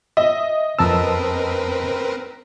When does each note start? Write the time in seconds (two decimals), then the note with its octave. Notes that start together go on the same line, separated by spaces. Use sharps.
0.17 D#5 E5
0.79 F2 C4 A#4 B4 A5 E6